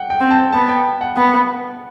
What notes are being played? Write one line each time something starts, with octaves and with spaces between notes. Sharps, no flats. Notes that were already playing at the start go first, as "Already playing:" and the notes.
Already playing: F#5 G5
G5
C4
A5
B3 A5
G5
F#5
B3 F#5